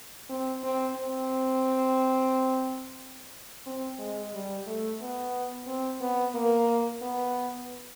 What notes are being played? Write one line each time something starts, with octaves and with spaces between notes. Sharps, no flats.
C4
C4
C4
C4
G#3
G3
A3
B3
C4
B3
A#3
B3